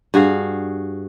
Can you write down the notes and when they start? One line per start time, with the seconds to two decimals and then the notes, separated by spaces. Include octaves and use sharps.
0.14 G2 F#4 G#4 F5